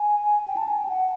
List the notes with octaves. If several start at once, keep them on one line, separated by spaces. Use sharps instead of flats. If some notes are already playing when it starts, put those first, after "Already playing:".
Already playing: G#5
G5
A5
G#5
G5
F#5